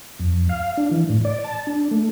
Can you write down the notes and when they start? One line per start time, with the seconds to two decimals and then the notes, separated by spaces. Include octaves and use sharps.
0.19 F2
0.49 F5
0.77 D4
0.91 E3
1.09 A2
1.25 D5
1.44 A5
1.67 D4
1.91 A3